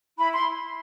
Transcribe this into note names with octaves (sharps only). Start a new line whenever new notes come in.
E4 B5
C6